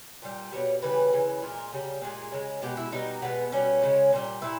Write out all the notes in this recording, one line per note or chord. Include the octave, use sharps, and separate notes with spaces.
A#2 G3
B2 G3 C#5
C#3 E3 G3 B4
C#3 E3 G#3
A#2 G#3 A#4
C#3 G3
A#2 G#3 G#4
C#3 G#3
B2 G#3 G4
E4
B2 G3 D#4
B2 G#3 B3
B2 G3 C#4
C#3 G#3
A#2 G3
A#2 E4